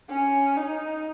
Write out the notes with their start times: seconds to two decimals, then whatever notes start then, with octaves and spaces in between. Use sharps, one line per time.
0.10 C#4
0.57 D#4